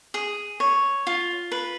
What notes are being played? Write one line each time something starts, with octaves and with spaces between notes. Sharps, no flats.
G#4
C#5
F4
B4